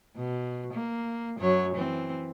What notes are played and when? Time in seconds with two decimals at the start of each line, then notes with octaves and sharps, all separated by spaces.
0.16 B2
0.73 A#3
1.39 F#2 F#3 C#5
1.75 E3 C4